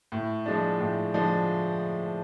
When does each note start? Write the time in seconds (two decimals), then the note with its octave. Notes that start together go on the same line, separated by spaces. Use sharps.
0.12 A2
0.46 F3 G#3 D4
0.80 A2
1.14 F3 G#3 D4